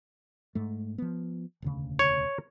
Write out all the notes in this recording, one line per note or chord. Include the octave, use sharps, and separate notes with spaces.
G#2 A3
F3 B3
E1 D2 C#3
C#5